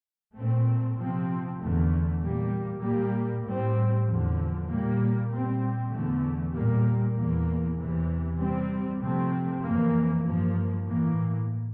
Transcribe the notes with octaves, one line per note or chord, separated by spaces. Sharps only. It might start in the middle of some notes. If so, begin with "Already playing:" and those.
A#2 A3 C4
C3 F3 C4
E2 D3 A3
A#2 G3 A#3
A#2 G3 A#3
A2 G3 C4
E2 D3 F3
A#2 G3 A#3
A#2 G3 C4
E2 D3 A3
A#2 G3 A#3
E2 E3 A#3
E2 C3 E3
C3 G3 C4
C3 F3 A3 C4
F2 E3 A#3
G2 F3 A#3
A2 E3 A#3